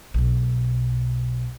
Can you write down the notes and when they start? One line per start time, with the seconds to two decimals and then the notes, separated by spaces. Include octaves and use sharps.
0.14 B1 B2